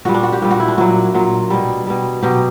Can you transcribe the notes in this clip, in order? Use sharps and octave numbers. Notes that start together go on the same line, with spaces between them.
A#2 G3 F#4
D4
F#4
G4
A#2 G3
F#4
E4
D4
A#2 F#3 F#4
A#2 F#3
B2 G3
B2 G3
B2 F#3 G4